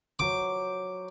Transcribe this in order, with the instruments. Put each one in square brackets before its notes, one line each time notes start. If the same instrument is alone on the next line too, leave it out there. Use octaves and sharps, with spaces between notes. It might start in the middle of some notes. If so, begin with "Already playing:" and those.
[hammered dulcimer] F#3 C5 [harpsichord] D6